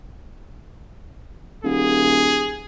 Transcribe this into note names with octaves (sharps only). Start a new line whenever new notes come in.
D#1 G#4